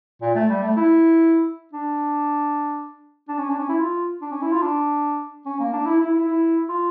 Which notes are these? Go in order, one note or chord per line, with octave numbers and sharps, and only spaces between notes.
A#2
A3
G3
A3
E4
D4
D4
C#4
D4
C#4
E4
F4
D4
C#4
E4
F4
D4
C#4
A#3
D4
E4
E4
E4
E4
F4